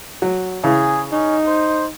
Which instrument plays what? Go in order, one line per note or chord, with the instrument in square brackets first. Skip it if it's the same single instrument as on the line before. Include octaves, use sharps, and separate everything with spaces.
[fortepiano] F#3
[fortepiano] C#3 E3 [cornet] G#4
[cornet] C#4 [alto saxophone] D#4
[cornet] C5